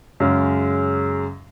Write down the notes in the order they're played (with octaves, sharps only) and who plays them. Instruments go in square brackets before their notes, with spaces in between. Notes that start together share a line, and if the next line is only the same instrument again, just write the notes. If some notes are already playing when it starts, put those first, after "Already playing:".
[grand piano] F#2 C#3 G#3 C#4 G#4